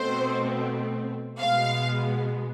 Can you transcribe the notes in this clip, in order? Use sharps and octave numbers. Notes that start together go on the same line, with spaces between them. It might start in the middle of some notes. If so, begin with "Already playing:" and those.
Already playing: B2 A3 C4 C5
B2 G#3 B3 F5